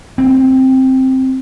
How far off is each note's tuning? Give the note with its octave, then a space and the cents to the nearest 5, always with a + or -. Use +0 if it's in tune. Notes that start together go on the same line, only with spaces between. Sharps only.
C4 +5